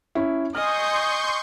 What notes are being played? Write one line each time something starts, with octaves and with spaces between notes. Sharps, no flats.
C#4 E4
D#5 G#5 C6 C#6 D#6 F6 G6